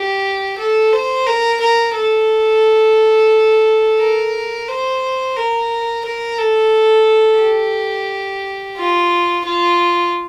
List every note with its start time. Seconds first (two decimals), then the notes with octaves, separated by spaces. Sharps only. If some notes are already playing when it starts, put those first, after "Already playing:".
Already playing: G4
0.58 A4
0.93 C5
1.27 A#4
1.60 A#4
1.95 A4
4.00 A#4
4.68 C5
5.36 A#4
6.05 A#4
6.38 A4
7.40 G4
8.77 F4
9.45 F4